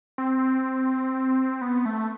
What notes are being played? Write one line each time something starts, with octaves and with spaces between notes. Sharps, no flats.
C4
B3
A3